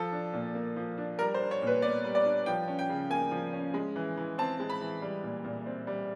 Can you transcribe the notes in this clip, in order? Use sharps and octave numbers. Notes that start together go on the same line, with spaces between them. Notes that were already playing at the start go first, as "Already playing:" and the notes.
Already playing: F3 A4
D4
A#2
A#3
F3
D4
G3 A#4
C5
D4
C#5
A#2 B4
B3 D5
G3
D5
D4
F3 G5
C#4
G5
C#3
A#3 G#5
F3
C#4
G#3
E3
E3
C4 A5
G#3
B5
E3
G3
A#2
A#2
C4
G3